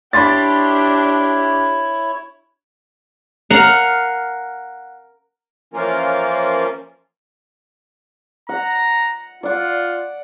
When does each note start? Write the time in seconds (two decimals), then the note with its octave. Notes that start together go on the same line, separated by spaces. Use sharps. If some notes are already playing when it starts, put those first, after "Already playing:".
0.13 D4 E4 G4 C#5 B5 C6 A6
3.50 A#4 F5 F#5
5.74 E3 F3 A#3 C#4 F4 A#4
8.49 F#5 A#5
9.43 F4 D5 F#5